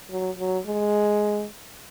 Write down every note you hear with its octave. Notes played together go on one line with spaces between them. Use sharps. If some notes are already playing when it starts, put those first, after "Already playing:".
F#3
F#3
G#3